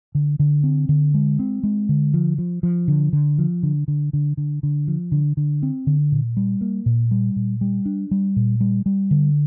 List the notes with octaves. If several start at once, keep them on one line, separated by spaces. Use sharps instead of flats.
D3
D3
C4
D3
G#3
C4
G#3
D3
F3
F3
F3
D3
D3
F3
D3
D3
D3
D3
D3
F3
D3
D3
C4
D3
A#2
G3
A#3
A#2
G3
A#2
G3
D4
G3
A#2
G3
G3
D3